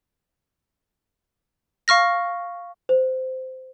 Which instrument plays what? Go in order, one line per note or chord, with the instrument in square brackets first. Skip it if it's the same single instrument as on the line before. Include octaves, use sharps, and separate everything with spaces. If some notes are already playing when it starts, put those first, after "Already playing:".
[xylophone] F5 C#6 F6 A#6
[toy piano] C5